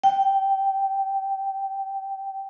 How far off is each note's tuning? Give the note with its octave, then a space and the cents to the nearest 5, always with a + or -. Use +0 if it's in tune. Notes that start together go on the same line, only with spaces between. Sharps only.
G5 -10